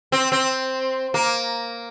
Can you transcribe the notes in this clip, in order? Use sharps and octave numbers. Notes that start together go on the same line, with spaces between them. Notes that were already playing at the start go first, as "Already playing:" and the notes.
C4
C4
A#3